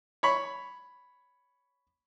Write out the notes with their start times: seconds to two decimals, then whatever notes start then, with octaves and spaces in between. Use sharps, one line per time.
0.23 C#5 B5